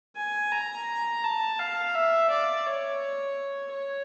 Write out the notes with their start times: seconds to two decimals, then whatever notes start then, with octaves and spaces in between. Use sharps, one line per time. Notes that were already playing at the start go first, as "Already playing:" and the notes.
0.17 G#5
0.52 A#5
1.24 A5
1.59 F5
1.95 E5
2.30 D5
2.67 C#5
3.73 C#5